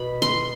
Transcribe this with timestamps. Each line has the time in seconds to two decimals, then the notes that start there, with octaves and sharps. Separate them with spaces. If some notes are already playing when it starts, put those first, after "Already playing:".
Already playing: B2 B5
0.22 C6